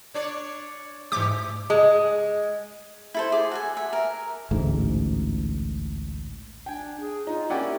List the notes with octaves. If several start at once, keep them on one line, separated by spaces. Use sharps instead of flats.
D4 C#5 D5
G#2 E3 A3 G4 D6
G#3
E4 A4 C5
G#4 D6
F#4 A4 G#5
E5
A#4
A1 D2 G#2
D4 G5 G#5
G#4
D#4 F4
A#3 C#4 E4 G4 D5 F#5 G5